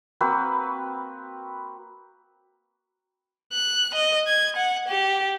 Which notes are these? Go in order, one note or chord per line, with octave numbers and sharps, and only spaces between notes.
A#3 C4 F#4 B4
F#6
D#5
G#6
F#5
G4